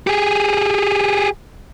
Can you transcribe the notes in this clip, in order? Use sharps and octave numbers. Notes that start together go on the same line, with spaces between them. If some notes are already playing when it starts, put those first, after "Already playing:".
G4 G#4